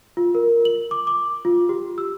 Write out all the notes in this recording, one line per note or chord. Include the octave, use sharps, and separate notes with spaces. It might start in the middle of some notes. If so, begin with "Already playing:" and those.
F4
A#4
F#7
D6
D6
F4
G4
E6